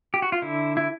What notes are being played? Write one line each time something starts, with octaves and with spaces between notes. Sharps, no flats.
G4
F#4
F4
D3 E4
E4